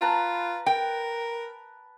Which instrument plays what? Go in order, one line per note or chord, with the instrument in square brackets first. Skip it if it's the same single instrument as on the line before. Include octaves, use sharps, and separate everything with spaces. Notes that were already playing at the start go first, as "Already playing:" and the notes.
[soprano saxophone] F4 [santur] B4 A5 A#5
[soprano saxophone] A#4 [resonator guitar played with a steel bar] G5